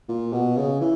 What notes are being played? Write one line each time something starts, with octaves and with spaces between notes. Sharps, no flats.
A#2
B2
C#3
E3